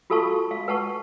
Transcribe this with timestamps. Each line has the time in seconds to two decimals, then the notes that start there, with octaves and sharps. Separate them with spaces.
0.10 F4 F#4 A4 F5 A5 C#6
0.51 F5
0.68 B4 F#5 A5 C#6